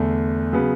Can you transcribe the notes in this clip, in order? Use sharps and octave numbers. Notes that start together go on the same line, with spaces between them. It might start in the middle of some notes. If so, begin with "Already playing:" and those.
Already playing: E2 D3 A3
C#3 F#3 B3